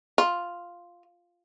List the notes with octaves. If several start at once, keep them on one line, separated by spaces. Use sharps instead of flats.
F4